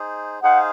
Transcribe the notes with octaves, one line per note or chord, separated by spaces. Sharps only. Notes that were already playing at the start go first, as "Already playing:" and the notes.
Already playing: D#4 G#4 C5
D#4 G#4 C5 F5 F#5